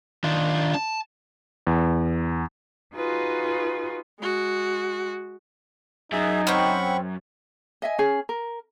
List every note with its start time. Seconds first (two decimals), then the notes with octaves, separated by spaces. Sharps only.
0.24 D#3 D4 F4
0.75 A5
1.67 E2
2.96 D#4 F4 F#4 G#4 B4
4.20 G#3 F#4
6.12 F#2 D#4 G#4 E5
6.47 C4 C#4 F#5 B5 C#6
7.82 D#5 E5 G#5
7.98 C#4 G#4
8.29 A#4